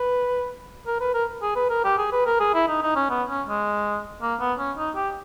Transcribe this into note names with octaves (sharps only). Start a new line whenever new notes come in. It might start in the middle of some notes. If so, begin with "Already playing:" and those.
Already playing: B4
A#4
B4
A#4
G#4
B4
A#4
G4
G#4
B4
A#4
G#4
E4
D#4
D#4
C#4
B3
C#4
G#3
A#3
B3
C#4
D#4
G4